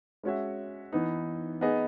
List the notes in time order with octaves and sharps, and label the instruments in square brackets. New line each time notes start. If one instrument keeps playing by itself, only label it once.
[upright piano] G#3 C#4 F#4 C#5 E5
E3 B3 D#4
B3 D#4 G#4 D#5